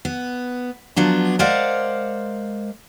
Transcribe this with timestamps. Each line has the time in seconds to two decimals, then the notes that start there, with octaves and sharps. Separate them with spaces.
0.05 B3
0.96 F3 F#3 B3 D4
1.39 G#3 A#4 C5 D5 F5 F#5